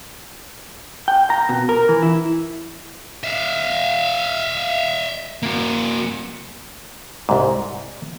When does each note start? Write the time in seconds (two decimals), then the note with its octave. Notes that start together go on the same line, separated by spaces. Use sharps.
1.08 G5
1.30 A#5
1.49 B2
1.69 A#4
1.88 E3
2.03 E4
3.24 E5 F5
5.43 A#3 F#4
7.29 C2 G#2